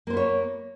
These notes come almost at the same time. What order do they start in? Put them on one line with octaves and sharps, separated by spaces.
A#3 C5 B3 C#5